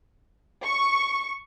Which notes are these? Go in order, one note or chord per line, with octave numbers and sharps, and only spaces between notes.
C#6